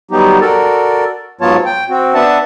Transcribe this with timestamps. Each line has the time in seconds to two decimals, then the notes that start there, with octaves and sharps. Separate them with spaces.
0.11 F#3 G3 B3 D#4 G4
0.41 F#4 A4 A#4 D5
1.41 G#2 F#3 B3 F4 C#5 A5
1.65 G5
1.90 C4 F#4
2.15 B3 D4 B4 E5 F#5 A5